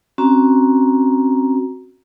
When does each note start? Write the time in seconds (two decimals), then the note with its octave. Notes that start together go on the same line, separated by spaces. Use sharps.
0.18 C4 C#4 F#4 A#5